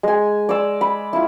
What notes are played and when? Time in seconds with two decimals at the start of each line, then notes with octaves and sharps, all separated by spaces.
0.03 G#3 G#5
0.49 D5 E6
0.81 B5
1.13 E4 F4